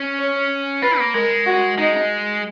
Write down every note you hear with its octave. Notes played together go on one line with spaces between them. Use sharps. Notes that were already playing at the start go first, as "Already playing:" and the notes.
Already playing: C#4
C#5
F4 B4
A#3
G#3 A#4
F#4
G#3 D#4